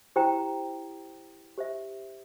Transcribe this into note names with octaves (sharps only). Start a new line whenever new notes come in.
E4 G4 C5 G5 A#5
G4 C5 E5